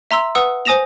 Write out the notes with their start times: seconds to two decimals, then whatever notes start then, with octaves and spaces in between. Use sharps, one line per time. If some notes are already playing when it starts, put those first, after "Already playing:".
0.11 E5 A#5 C6 E6
0.35 B4 F#5 D#6 E6
0.65 C5 G#5 D#6 A#6 E7 F7